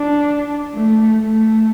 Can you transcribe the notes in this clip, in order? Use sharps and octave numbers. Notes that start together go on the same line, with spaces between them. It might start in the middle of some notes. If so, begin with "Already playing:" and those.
Already playing: D4
A3
A3